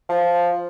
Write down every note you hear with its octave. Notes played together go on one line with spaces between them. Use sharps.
F3